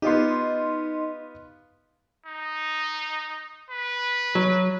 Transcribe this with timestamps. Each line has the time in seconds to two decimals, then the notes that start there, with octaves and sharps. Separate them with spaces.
0.02 B3 D#4 F4 G4 D#5 C6
2.26 D#4
3.70 B4
4.35 F#3